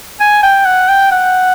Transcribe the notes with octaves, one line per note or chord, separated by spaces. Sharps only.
G#5
G5
F#5
G5
F#5